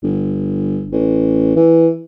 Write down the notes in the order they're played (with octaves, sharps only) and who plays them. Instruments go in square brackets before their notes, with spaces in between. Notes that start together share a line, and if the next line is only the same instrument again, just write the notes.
[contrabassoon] G1
A1
E3